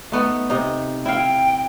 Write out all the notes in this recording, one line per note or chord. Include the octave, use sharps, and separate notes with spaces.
A3 B3 D#4
C3 D#4
E4 F5 G5